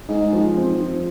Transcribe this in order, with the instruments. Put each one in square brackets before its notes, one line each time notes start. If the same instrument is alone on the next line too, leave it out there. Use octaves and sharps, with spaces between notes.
[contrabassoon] G#2 [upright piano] D#4
[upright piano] F3
C4
F3